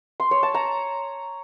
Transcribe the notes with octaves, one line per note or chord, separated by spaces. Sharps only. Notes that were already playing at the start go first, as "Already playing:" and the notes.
C6
C#5
A5
A#5